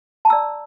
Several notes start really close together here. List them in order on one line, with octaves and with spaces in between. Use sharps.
A5 A#5 E6 D5